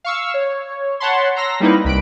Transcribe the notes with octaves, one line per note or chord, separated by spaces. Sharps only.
F5 C#6 E6
C#5
C#5 F#5 A5 B5 C6
A#5 C6 E6 A#6
G3 A#3 C4 D#4 E4 B4
C2 B5 F#6 D7